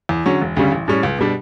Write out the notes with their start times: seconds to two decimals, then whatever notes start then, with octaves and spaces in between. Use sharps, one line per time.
0.09 E2
0.26 D3 F#3 C#4
0.41 E1
0.57 D2 C#3 G3 C#4
0.72 A1
0.88 A2 G3 C#4
1.03 C#2
1.19 B2 G3 D4